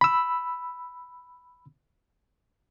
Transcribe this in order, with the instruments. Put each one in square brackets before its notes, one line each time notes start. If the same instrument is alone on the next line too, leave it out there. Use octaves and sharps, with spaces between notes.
[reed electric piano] B5 E6